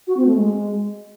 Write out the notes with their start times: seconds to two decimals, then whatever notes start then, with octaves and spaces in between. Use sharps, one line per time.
0.07 F#4
0.17 C4
0.26 A3
0.36 G#3